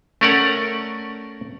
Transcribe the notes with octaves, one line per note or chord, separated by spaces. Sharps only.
A3 C#4 A#4 D5 F#5